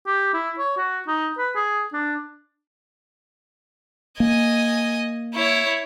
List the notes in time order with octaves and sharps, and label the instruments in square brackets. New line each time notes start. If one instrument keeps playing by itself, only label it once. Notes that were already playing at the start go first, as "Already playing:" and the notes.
[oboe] G4
E4
C#5
F#4
D#4
B4
G#4
D4
[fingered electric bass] A#3 [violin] D#5 G#5
[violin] E4 C#5